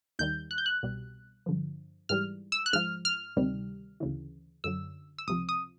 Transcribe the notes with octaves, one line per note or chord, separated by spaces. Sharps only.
D#2 D#3 G3 G6
F#6
G6
F#6
C2 B2 G3
G2 D3 F3
G#2 E3 G3 F6
E6
F#6
G#2 F3 F6
F6
D2 C3 D#3 G3
D2 C#3 E3
F#2 D3 F#3 E6
E6
C#2 C3 F3 D#6
D#6